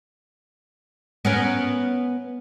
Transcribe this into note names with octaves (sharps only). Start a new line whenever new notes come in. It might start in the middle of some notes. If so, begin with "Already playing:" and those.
B3 C#4 A#4